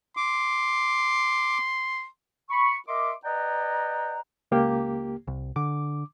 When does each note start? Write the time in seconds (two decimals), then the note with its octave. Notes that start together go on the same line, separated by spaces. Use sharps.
0.17 C6 D6
2.50 B5 C#6
2.88 A#4 D#5 E5 C6 D6
3.25 B4 D5 D#5 F#5 G5 A#5
4.51 C#2 A#3 G4
5.27 C2
5.56 D3 D6